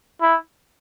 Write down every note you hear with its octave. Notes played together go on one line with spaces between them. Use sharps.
E4